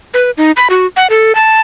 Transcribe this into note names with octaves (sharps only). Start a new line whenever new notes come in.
B4
D#4
B5
F#4
F#5
A4
A5